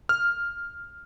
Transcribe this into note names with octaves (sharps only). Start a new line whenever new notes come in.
F6